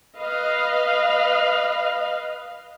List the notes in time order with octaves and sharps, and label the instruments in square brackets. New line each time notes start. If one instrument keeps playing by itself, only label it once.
[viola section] B4 D#5 F5